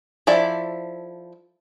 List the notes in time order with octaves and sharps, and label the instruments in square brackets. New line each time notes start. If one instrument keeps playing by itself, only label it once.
[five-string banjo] F3 E4 A4 D5 E5